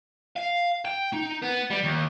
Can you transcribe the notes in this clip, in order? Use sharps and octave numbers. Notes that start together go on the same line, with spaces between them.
F5
G5
D#4
B3
G3
D#2